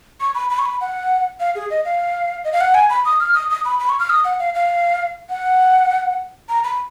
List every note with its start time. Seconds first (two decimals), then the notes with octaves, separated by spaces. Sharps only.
0.20 C#6
0.35 B5
0.50 B5
0.59 C#6
0.66 B5
0.81 F#5
1.40 F5
1.55 G#4
1.70 D#5
1.85 F5
2.44 D#5
2.53 F5
2.61 F#5
2.74 G#5
2.90 B5
3.05 D#6
3.20 F6
3.34 D#6
3.50 D#6
3.65 B5
3.80 B5
3.89 C#6
3.99 F6
4.10 D#6
4.24 F#5
4.39 F5
4.55 F5
5.29 F#5
6.49 A#5
6.64 B5